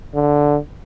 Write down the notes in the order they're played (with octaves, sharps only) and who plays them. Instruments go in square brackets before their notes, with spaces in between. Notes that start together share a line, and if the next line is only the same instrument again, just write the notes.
[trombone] D3